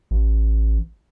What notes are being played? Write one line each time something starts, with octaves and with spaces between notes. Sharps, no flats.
A1